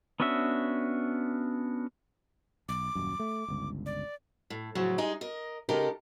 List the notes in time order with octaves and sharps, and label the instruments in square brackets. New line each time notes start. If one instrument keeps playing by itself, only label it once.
[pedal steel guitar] B3 C#4 D4 F#4 E5
[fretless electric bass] B1 [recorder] D6
[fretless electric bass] D#1 F#2
A3
G1 C#2
[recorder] D5
[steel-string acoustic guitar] A2
A2 C#3 F3 F#3
G3 G#3 D#4 G#4
A#4 D#5
C#3 G#3 D#4 G4 A4 A#4